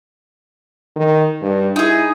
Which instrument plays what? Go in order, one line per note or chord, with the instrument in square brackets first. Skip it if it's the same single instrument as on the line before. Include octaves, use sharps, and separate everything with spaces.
[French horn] D#3
G2
[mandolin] D#4 G#4 [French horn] E4